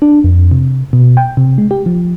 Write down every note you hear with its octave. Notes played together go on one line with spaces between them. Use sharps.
D4
F2
C3
B2
G5
C3
G#3
G4
F3